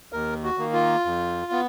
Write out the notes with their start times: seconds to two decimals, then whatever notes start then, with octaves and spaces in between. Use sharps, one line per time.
0.13 D#2 A#4
0.44 F#4
0.58 D#3 A#3
0.74 F4
1.05 F2
1.52 B3